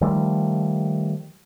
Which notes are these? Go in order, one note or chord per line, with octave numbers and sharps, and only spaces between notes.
D#3 F3 G3 A3